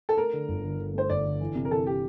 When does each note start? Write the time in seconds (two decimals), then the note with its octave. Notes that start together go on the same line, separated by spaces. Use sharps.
0.09 A4
0.17 A3 A#4
0.33 D3
0.49 G1
0.64 D3
0.79 D3
0.94 A3 C5
1.10 G1 D5
1.25 D3
1.40 E3
1.55 C3
1.65 A#4
1.71 E3 A4
1.86 G4